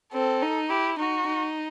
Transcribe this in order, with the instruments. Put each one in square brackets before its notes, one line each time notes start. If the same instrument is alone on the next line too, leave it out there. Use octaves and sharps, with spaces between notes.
[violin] C4 [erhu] A4
[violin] D#4
[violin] E4 [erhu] G4
[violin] D#4 [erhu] F#4
[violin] D#4